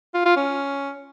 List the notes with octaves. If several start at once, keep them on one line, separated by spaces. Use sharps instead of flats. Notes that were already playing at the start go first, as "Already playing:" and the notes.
F4
F4
C#4